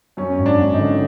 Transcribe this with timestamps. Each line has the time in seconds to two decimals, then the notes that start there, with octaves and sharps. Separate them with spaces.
0.17 F#2 C#4
0.38 G#1
0.46 D4
0.58 G#1
0.73 D#4
0.80 D3